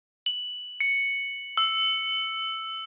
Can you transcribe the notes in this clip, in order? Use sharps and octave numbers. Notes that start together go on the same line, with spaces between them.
F#7
C#7
E6